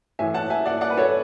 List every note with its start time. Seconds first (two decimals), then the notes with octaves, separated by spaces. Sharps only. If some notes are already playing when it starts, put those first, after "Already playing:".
0.19 A2 E3 E5 G#5
0.34 F#5 A5
0.50 E5 G#5
0.66 D5 F#5
0.81 D5 F#5
0.90 B4
0.97 A4 C#5